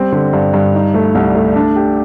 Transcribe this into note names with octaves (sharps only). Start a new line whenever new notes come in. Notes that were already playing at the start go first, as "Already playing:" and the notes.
Already playing: G3 C4
D3
G2
G2
D#4
A3
C2
A3
D4
G4